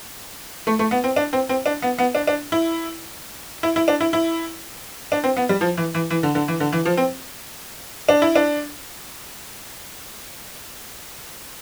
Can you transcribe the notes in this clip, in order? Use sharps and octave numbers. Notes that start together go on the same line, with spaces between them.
A3
A3
B3
C4
D4
C4
C4
D4
B3
B3
D4
D4
E4
E4
E4
D4
E4
E4
D4
C4
B3
G3
F3
E3
E3
E3
D3
D3
E3
D3
E3
F3
C4
D4
E4
D4